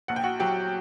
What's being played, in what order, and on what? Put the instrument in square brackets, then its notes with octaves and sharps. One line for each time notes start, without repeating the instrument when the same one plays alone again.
[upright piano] A#1 F#5
G5
F#4 F#5
F#3 G4 G5